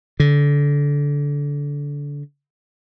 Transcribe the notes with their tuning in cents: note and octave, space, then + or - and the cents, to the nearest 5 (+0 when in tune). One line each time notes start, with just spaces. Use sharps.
D3 -25